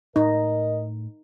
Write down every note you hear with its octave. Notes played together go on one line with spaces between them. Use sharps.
A2 D#4 A#4 D#5